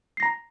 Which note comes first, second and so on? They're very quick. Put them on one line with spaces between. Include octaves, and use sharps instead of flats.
C7 A#6 A#5